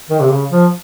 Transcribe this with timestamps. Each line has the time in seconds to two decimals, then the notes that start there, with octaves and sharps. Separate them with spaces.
0.10 D#3
0.21 C3
0.30 C#3
0.50 F3